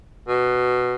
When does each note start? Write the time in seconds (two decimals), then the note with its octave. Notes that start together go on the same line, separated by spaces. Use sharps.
0.28 B2